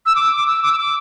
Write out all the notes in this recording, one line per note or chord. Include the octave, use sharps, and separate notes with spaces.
E6
D6
D6
E6
D6
E6
D6